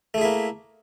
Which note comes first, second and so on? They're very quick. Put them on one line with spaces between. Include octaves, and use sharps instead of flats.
A3 G#4 E4 A#3